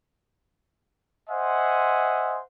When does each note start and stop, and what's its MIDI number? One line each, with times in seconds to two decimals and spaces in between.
1.29 2.41 72
1.29 2.41 75
1.29 2.41 76
1.29 2.41 78
1.29 2.41 80
1.29 2.41 84